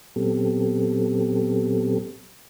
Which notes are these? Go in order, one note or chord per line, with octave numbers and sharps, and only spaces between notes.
A#2 F#3 B3 C4 G4 A4